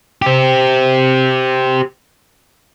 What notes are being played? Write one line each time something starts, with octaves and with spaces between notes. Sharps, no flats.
G4 C5